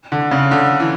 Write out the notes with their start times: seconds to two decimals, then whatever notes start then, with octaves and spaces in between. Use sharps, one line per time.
0.12 D3
0.31 C#3
0.51 D3
0.80 E3